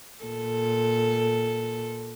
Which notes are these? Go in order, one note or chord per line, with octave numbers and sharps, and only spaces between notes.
A#2 A4